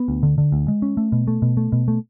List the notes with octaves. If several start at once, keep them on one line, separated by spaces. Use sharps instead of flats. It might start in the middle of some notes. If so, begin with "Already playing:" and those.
Already playing: B3
D2
D3
D3
D2
G#3
C#4
A3
B2
A3
B2
A3
B2
A3